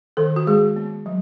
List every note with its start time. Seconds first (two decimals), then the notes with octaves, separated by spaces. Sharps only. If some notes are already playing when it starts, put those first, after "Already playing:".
0.17 D#3 A4
0.36 F#4
0.47 G#3 G#4
0.76 B3
1.06 F#3